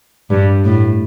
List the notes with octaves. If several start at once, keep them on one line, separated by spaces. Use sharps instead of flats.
G2
A2